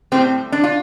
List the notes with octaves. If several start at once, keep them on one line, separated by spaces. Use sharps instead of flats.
A2 G3 C4
D4
F4